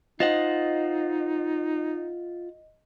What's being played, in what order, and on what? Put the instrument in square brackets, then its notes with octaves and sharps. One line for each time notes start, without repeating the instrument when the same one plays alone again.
[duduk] D#4 [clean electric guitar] F4 C5 F#5 [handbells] D#5